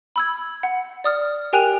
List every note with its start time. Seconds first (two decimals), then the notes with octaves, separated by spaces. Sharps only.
0.16 B5 E6 G#6
0.63 F#5
1.04 D5 D#6 F6
1.53 G4 A#4 G5 G#5 F#6 F7